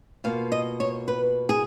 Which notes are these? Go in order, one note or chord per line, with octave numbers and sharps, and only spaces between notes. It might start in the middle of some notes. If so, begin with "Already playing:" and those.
B2 A#3 F4 F5
D#5
C#5
B4
G#4